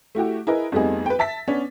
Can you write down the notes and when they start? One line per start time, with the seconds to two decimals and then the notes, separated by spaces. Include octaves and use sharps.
0.15 A3 E4 F#4 G4
0.47 E4 G#4 A#4 B4 D#5
0.72 F2 G3 A3 B3 D#4 G#4
1.06 B4 G5
1.19 E5 A5 A6 B6
1.48 B3 C#4 D4